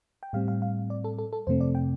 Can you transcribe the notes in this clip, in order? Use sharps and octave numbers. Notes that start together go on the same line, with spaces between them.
G5
A2 G3 C4 F5
F5
F5
D5
A4
A4
A4
F2 C3 A3 C4 C5
D5
G5